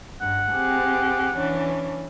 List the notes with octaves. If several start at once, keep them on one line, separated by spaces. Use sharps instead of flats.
G2 F#5
C4 G4 G#4
E3 C#4 D4